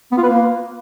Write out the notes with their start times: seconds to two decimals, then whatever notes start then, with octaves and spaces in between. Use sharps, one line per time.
0.12 B3
0.18 F4
0.23 B4
0.29 A#3